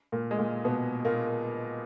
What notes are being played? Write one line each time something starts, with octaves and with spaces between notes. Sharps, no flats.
A#2 A#3
G#3
A#2 A#3
B2 B3
A#2 A#3